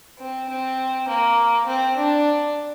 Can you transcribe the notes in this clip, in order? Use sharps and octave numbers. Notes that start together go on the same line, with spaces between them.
C4
C4
A#3
C4
D4